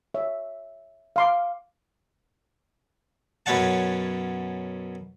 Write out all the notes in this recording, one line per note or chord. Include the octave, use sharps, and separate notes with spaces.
C#5 E5
F5 C6 D6
F#2 B2 C#4 C#5 F#5 A5